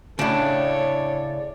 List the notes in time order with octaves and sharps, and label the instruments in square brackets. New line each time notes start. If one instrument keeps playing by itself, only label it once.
[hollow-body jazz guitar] A2 C#3 [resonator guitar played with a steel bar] D4 [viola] A4 C#5 [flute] D5